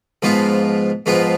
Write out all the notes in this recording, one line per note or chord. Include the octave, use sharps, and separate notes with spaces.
G#2 F3 B3 F4
G#2 F3 B3 F4